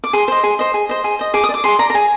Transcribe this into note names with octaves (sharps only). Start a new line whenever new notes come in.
D6
G#4 C6
C5 D#5
G#4
C5 D#5
G#4
C5 D#5
G#4
C5 D#5
G#4 D6
D#6
D5
D6
G#4 C6
D5 A#5
A#5
G#4 G#5